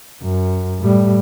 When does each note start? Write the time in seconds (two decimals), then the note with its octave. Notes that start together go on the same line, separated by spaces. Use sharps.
0.22 F#2
0.79 A2 G3